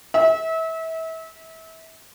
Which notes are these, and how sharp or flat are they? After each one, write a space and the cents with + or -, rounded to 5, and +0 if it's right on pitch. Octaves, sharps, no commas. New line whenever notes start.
E5 -30